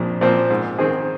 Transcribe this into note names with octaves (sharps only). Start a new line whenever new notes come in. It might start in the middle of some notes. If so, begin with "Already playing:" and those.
Already playing: A#1 A#2 F3 C4
A#2 F3 C4
G#2
D#3 C4 G#4